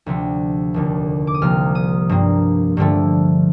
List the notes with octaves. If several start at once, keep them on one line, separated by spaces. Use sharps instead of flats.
D2 C3 F3 A3
F1 D#2 D3
D6
D#6
C2 C3 F3 A#3 F6
D#6
G2 F3 A#3
G2 D3 F3 A3